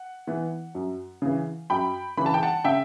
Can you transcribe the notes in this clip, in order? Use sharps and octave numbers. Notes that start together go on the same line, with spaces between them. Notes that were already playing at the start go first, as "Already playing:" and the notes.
Already playing: F#5
E3 B3
F#2
C#3 E3
F#2 G5 B5
C#3 E3 B5
A5
G5
F#5 A5
C#3 E5 G5